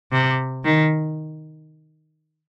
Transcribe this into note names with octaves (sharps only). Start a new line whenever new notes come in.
C3
D#3